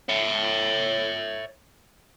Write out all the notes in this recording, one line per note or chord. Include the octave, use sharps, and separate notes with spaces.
C#5 E5